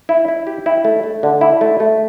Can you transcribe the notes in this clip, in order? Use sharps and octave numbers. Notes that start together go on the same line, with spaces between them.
E4
E4
G4
E4
A3
A3
D3
E4
A3
A3